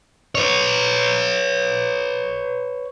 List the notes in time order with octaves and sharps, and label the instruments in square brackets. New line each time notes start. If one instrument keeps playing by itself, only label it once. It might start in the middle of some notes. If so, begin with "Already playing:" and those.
[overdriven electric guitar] B4 C#5